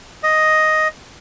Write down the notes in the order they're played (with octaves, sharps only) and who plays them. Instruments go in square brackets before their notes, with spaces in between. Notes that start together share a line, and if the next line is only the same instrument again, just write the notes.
[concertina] D#5